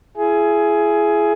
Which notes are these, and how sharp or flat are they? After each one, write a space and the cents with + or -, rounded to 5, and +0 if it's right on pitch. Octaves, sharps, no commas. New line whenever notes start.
E4 +35 G#4 +15